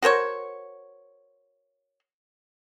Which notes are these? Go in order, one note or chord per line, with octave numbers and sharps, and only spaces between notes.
F#4 A#4 C5 C#5